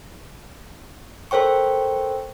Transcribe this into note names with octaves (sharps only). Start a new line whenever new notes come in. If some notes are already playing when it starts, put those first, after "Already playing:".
A4 A#4 C5 G5 C#6